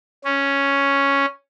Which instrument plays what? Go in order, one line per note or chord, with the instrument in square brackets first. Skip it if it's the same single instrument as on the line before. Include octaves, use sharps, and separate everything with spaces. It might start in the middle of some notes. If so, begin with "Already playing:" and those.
[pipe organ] C#4